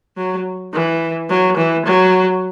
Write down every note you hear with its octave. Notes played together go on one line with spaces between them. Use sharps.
F#3
E3
F#3
E3
F#3